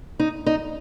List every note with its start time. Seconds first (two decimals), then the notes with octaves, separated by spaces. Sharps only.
0.20 D#4
0.46 D#4